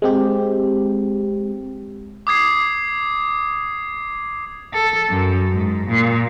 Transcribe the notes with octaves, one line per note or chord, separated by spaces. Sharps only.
G#3 C4 G4
D6 D#6 G#6 C7
A4
F#2
G#2
A#2